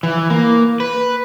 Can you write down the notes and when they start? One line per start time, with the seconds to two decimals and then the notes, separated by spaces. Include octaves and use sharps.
0.03 E3
0.30 A#3
0.80 B4